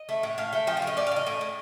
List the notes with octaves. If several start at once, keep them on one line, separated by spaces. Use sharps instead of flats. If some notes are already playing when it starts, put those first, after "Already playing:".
Already playing: D#5
A3
A2
A2 F5
A3 G5
F3 G5
F5
A2
D#5
A2 D5
F5
A2
D#5
A2
A2